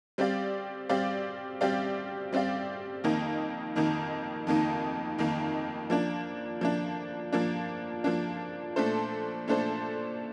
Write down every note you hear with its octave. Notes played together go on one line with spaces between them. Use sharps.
G3 C4 G4 D5 F5
G3 C4 G4 D5 F5
G3 C4 G4 D5 F5
G3 C4 G4 D5 F5
F2 D#3 A#3 D#4
F2 D#3 A#3 D#4
F2 D#3 A#3 D#4
F2 D#3 A#3 D#4
F3 A#3 D4
F3 A#3 D4
F3 A#3 D4
F3 A#3 D4
A#2 A3 D4 A4 C5
A#2 A3 D4 A4 C5